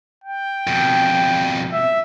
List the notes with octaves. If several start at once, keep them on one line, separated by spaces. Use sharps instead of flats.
G5
F2 B2
E5